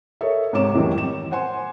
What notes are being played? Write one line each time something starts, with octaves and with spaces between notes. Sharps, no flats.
A4 A#4 C#5 D#5 E5
G#2 C3 C#4 C#5 D6 E7
F2 A2 D#3 E3 F#3 G3
E7
C5 F#5 G#5 C6